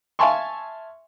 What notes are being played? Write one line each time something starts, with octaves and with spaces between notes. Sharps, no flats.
E5 F5 G#5 A5 C6 C#6